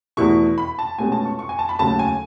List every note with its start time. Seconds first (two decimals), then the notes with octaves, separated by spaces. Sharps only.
0.17 E2 B2 A3 E4 C#6
0.58 B5
0.79 A5
0.98 C#2 B2 A3 C#4 G#5
1.12 A5
1.25 C#6
1.39 C#6
1.49 G#5
1.59 A5
1.69 B5
1.79 D#2 C#3 F#3 A3 A5
1.99 G#5